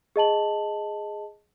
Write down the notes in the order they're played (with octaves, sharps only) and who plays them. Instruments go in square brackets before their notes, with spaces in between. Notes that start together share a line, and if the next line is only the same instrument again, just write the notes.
[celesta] G#4 D#5 A5 F#7